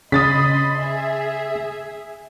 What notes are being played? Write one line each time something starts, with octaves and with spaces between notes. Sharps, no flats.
C#3 D#5 B5 C6 D#6 A6 B6
G#4 E5